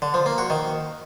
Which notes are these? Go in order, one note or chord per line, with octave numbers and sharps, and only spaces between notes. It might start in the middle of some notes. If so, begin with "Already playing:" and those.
D3
F3
A#3
F#4
D#3